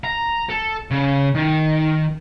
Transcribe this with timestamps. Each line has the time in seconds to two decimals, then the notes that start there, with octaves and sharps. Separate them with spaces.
0.04 A#5
0.50 A4
0.91 C#3
1.35 D#3